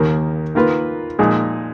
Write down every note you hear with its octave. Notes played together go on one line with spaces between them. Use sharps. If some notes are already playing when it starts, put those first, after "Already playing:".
Already playing: D#2 D#3 A#3
D#3 A#3 F4 B4
A#2 F3 G#3 D#4 G#4